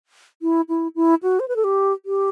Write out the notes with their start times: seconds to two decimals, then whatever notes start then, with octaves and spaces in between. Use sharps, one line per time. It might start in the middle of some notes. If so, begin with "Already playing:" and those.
0.42 E4
0.69 E4
0.96 E4
1.23 F#4
1.40 C5
1.48 B4
1.56 A4
1.64 G4
2.06 G4